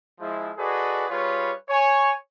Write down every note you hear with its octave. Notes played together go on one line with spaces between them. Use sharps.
F3 G#3 E4
F#4 G#4 A4 B4 D5 D#5
G3 F4 G#4 B4 C#5
C#5 G#5